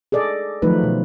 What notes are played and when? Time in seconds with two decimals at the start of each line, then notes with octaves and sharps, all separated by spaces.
0.12 G#4 A4 D5 D#5
0.62 D#3 F3 F#3 A3 D#4 B4
0.83 B2